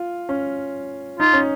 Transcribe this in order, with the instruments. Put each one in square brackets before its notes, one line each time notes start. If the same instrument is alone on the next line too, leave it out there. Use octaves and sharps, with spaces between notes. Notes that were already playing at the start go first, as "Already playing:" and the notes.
Already playing: [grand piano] F4
C#4
[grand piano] D#4 [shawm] F4
[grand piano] C#4